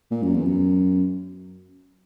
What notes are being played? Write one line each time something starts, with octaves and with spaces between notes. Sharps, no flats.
A#2
F#2
E2
F#2